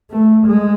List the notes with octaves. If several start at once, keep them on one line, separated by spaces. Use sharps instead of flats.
A3
G#3